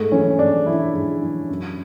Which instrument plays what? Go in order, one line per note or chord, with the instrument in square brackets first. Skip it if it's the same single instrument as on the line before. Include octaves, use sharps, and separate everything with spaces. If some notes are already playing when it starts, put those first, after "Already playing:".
Already playing: [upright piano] G#2 A3
E3 C#4
G#2 D4
E3 E4
G#2
E3
F#2